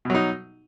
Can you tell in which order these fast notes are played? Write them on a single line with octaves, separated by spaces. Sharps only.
B2 F#3 D#4